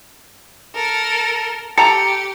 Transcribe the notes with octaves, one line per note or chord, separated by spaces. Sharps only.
A4 A#4
G4 A4 G5 A#5 C#7